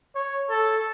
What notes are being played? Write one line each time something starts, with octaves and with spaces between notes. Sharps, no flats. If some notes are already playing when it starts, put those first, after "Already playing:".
C#5
A4